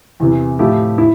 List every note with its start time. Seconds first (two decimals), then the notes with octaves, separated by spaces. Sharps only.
0.20 E2 C3 E3
0.59 A2 F3 A3 E4 G4
0.98 E4